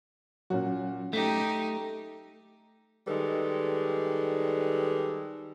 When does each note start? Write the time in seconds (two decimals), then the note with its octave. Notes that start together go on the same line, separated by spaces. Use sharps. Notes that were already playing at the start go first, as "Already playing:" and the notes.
0.50 A#2 F#3 C#4 F#4
1.13 A3 D#4 G4 B6
3.08 D#3 G3 G#3 A4 B4